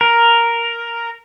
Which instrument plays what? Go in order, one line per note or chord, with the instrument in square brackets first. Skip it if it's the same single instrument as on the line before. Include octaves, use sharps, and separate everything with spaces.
[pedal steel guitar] A#4